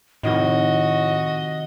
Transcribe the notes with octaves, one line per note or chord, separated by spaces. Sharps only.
A2 C3 D#3 F3 F#4 D#5